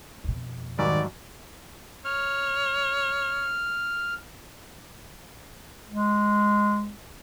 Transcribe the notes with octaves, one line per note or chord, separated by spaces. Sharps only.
F2 B2
G#2 D#3 F#3 G3 D5
C#5 F6
G#3